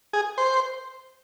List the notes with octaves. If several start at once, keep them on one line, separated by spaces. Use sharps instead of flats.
G#4
C5